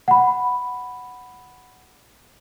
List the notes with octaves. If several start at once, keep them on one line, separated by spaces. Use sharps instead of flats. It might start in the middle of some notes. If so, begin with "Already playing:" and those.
F#5 B5